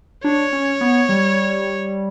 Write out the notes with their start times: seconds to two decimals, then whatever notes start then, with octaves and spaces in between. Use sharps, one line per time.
0.24 D4 C#5
0.53 C#4
0.81 B3
1.09 G3